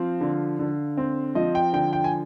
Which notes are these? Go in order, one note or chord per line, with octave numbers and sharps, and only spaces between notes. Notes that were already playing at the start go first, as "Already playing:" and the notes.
Already playing: F3 C4 F5
D3
D3
C4
F3 D#5
G5
D3 G5
G5
G#5